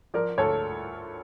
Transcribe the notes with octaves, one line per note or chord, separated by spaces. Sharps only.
F3 A#4 D5
D2 A4 C#5